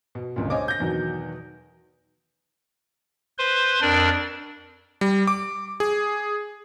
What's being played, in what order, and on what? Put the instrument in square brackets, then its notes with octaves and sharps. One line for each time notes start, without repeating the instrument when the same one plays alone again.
[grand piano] B2
G1 C#2 A#2
C5 C#5 D#5 G#5 D6
G6 A#6
E2 B2 D#3 F#3
[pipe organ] B4 C5 C6
F2 D4 A#4 D5
[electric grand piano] G3
D6
G#4